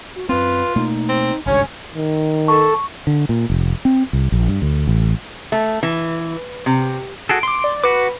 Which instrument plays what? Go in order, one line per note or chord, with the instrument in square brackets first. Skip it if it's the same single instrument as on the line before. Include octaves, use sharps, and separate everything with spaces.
[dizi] F#4
[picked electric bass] F#2 C4 [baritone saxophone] F4 [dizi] B4
[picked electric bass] B2 A3 A#3 [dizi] D#4
[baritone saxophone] C4
[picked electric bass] G#1 C#2 G2 [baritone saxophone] C#4 [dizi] C#5
[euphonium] D#3
[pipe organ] A4 [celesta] C#6
[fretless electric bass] D3
A#2
F1
C4
C2
A#1
G2
D2
A1
[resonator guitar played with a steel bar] A3
E3
C3
[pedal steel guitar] F#4 G#4 A4 [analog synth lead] D7
[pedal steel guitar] C6 D6
[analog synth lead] D5
[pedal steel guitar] F#4 D6 [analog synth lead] B4